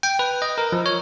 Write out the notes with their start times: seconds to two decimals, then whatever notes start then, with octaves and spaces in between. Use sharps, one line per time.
0.03 G5
0.19 B4
0.42 D#5
0.58 A#4
0.72 F3
0.86 C#5